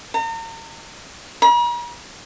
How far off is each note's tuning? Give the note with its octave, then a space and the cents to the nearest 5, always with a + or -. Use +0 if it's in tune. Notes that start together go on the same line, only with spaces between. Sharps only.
A#5 -40
A#5 +45